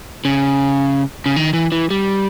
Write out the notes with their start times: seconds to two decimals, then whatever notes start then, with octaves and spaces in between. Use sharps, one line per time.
0.25 C#3
1.26 C#3
1.36 D#3
1.53 E3
1.72 E3
1.91 G3